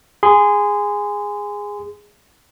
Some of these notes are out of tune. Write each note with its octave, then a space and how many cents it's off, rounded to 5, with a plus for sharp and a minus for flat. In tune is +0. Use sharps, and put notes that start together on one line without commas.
G#4 -10 C6 -30